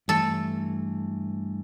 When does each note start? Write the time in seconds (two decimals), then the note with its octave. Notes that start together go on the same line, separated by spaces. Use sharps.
0.08 G2 E3 A3 A4